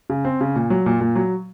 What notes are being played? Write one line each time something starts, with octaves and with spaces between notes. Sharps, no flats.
C#3
C4
C#3
A#2
F#3
A#2
A#2
F#3